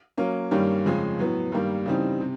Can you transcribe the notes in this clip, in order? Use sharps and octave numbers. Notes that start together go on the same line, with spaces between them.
F#3 A#3 C#4
G2 D#3 G3 A#3 C#4
F2 C#3 F3 G#3 C#4
A2 F#3 B3
G2 D#3 G3 A#3
C#3 E3 G3 C4 D#4
C3